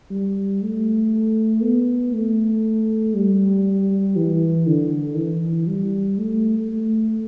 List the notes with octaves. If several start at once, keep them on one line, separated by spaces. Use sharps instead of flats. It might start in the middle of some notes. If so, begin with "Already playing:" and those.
G3
A3
B3
A3
G3
E3
D3
E3
G3
A3
A3